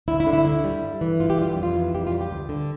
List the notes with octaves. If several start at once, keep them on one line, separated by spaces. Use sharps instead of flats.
D2 E4
E4
D3
E4
D2 E4
G3
G2
E3
G2 F4
G4
G3 F4
F2 G4
F4
E3
F2 G4
F4
G3
G4
D2
D3